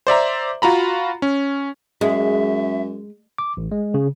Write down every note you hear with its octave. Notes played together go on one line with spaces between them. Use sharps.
C5 D5 E5 A#5
F4 F#4 A#5 B5
C#4
F#2 G#3 E5
D6
A1
G#3
C#3